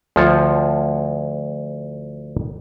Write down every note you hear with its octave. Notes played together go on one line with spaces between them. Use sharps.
D2 F3 F4 C#5 A5